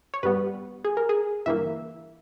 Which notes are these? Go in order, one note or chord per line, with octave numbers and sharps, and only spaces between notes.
C#5
G2 G3 B3 B4
G#4
A#4
G#4
G1 G2 E3 A#3 E5